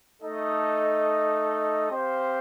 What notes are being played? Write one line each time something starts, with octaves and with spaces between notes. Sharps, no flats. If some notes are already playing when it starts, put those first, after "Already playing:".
A3 D#4 A4 D#5
C4 G4 C5 F5